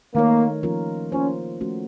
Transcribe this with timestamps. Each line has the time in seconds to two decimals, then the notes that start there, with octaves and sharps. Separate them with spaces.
0.14 D#3 A3 A#3 D#4 A#4 C#5
0.63 F3 A#3 C#4 F4 A#4
1.12 F3 A#3 C#4 F4 C5
1.61 F3 A3 C#4 F#4